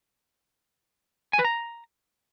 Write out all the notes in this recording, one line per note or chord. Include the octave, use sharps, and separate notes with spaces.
G#5
B4
A#5